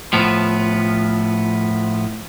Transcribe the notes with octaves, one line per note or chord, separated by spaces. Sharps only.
A2 F3 B3